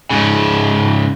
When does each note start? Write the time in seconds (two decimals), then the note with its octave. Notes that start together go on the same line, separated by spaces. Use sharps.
0.11 G#2 C#3